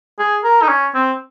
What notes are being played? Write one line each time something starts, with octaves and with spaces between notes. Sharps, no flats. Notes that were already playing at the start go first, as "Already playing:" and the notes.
G#4
A#4
D#4
C#4
C4